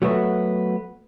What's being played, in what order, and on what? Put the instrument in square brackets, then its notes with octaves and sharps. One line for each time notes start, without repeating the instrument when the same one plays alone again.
[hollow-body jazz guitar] F#3 A3 B3 F#4